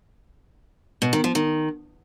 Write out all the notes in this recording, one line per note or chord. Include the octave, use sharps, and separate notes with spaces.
B2
D#3
F3
D#3